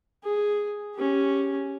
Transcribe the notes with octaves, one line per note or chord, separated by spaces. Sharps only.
G#4
C#4 G4